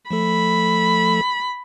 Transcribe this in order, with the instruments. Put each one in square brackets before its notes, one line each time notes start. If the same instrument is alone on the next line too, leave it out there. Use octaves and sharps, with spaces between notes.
[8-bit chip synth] F3 A3 A4 [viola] B5